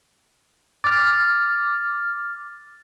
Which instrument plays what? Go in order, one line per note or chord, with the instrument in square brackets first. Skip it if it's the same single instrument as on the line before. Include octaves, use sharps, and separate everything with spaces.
[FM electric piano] D6 F6 [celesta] A6